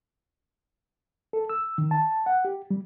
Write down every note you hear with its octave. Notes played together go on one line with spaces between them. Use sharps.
A4
E6
D#3
A5
F#5
G4
G3